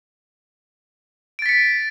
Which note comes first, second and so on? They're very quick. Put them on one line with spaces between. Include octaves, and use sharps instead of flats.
D7 A6 B6 C#7